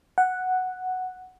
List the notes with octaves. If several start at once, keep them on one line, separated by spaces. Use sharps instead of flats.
F#5